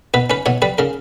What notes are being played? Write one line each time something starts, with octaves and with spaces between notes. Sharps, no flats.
B2 B4
C#4 B4
B2 C#5
G3 B4
C#3 A#4